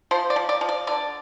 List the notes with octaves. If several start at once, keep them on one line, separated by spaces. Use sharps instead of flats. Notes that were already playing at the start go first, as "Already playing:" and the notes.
F3 C5
D5
F3
D5
F3
D5
D3 D5